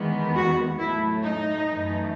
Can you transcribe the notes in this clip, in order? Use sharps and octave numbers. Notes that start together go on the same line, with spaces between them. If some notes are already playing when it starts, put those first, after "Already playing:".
Already playing: E2 D#3 G#3 B3
F#4
A2 F#3 A3 E4
D#4
F#2 E3 A3